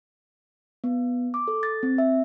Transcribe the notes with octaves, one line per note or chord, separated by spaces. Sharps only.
B3
D6
A4
A6
C4
E5